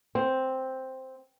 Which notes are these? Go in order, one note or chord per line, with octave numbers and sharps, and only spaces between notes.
C4